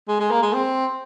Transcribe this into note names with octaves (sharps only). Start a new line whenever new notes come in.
G#3
G#3
A#3
G#3
C4